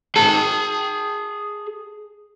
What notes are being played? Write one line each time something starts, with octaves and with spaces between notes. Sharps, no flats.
G#4 A5